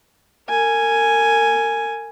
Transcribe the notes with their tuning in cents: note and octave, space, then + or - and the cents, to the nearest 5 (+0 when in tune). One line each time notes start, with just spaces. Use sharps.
A#4 -35 G#5 +0